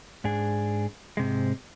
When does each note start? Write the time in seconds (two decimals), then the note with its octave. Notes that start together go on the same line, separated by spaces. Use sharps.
0.24 G#2 D4 G#4
1.17 G#2 C3 G#3